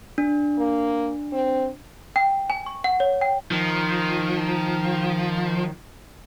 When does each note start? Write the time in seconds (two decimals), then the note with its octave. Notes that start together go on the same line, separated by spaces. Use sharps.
0.18 D4
0.58 A#3
1.32 C4
2.16 G5
2.50 G#5
2.66 C#6
2.84 F#5
3.00 C#5
3.21 G5
3.51 D#3 F3